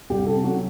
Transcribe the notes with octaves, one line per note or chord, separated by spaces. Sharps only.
C2 G4
C3 A4
F#3 F#4